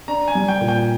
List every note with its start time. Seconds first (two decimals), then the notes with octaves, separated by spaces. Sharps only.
0.08 D4 A#5
0.28 G#5
0.35 G3
0.48 G5
0.61 A#2
0.68 G5